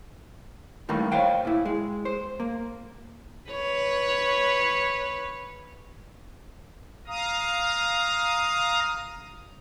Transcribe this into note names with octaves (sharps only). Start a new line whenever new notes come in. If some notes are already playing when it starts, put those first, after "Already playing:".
G2 D#3 E3 A3 A#3 B5
C5 C#5 F5 G5
A#2 E4
G#3
C5
A#3
B4 C#5
F5 A#5 D#6